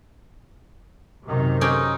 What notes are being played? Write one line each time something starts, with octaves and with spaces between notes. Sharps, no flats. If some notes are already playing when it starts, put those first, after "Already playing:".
F#2 C3 D#3
C4 C#4 D#4 G4